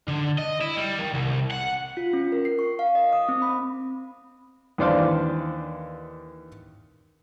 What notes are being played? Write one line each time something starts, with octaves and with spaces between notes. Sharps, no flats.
D3
D#5
E4
G3
D#3
C2
F#5
F4
C#4
A#4
C7
C#6
F5
D#5
D#6
C4
B5
D#2 E3 D4 C5 D5 F5